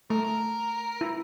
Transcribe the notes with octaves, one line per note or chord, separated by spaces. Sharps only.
A3 A#3 A#4
A#4
E4